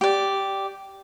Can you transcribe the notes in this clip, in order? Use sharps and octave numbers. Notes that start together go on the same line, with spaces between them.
G4 D5